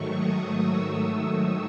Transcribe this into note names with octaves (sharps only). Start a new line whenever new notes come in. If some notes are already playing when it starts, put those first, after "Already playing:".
Already playing: G#2 D#3 F#3 A3 C#6
D#6
E6